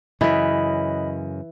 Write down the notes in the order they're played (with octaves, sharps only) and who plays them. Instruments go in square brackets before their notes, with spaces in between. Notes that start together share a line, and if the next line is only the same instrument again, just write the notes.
[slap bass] F#2 C#3 [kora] E3 [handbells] D#5 B5